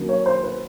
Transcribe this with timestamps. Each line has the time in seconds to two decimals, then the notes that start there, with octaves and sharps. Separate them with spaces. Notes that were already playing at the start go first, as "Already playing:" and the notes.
Already playing: D#3 F#3 A#3 C#4
0.09 C#5
0.26 C5
0.43 B4